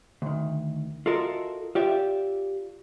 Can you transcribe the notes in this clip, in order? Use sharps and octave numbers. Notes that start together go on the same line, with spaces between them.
D2 D#3
F4 F#4 A4 A#4 D#5 E5
F4 G4 D5 E5